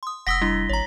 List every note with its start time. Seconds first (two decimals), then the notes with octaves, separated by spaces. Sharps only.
0.03 C6 D#6
0.27 F1 F#5 D#6 E6 A#6 B6 G7
0.41 G3 D4 E4
0.69 G#1 C#5 A#5